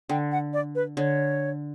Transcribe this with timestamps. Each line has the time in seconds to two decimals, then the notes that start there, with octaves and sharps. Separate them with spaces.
0.09 D3 G5
0.31 F#5
0.53 D5
0.75 B4
0.97 D3 C#5